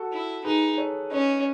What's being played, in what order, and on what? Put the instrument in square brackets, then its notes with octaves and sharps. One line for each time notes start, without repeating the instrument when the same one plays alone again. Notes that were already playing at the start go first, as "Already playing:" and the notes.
Already playing: [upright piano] F#4 A4
[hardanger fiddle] E4
[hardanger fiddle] D#4 [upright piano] G#4 B4
[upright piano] A4 C#5
[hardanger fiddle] C#4 [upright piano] B4 D#5